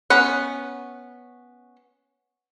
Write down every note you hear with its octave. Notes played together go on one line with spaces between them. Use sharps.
B3 C#4 F#5